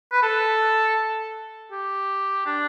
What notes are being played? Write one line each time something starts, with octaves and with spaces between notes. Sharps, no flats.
B4
A4
G4
D4